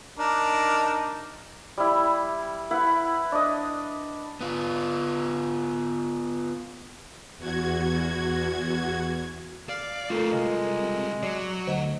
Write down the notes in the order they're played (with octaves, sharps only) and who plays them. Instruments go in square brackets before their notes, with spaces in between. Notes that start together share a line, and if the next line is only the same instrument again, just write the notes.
[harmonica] D4 D#4 A#4
[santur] G3 E4
E4 B4 F#5
D4 D#5
[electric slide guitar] B3 F4
[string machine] E2 F#4 G#6
[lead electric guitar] D5 [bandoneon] F5
[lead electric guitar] A3 C4 [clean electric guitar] F4 A4 A#4
[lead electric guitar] C2 C3 [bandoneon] G#3
[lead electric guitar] F#3 [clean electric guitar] D5 [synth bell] C7
[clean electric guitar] D2 [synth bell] C5 D#5 F#5